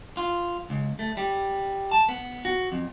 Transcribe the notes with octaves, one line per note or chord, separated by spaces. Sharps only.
F4
C#2
A3
G3
A5
B3
F#4
F2